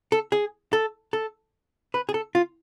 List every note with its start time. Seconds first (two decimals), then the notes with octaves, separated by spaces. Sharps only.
0.12 A4
0.32 G#4
0.73 A4
1.13 A4
1.94 B4
2.09 G#4
2.14 A4
2.35 F4